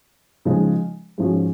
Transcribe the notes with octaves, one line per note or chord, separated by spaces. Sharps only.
C#3 F3 G#3 D#4
G#2 F3 G#3 C#4 F#4